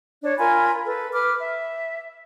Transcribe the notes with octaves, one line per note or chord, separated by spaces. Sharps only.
D4 C#5
F4 A#4 G#5 B5
A4 B4
B4 D6 F6
E5